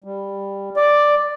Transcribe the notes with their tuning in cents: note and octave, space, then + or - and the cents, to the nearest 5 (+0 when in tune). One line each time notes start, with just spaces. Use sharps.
G3 +10
D5 +5